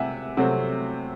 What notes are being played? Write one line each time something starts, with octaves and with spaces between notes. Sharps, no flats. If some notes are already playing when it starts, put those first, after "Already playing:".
Already playing: C3 E5 F#5 G#5
C3 F#3 A3 C4 F#4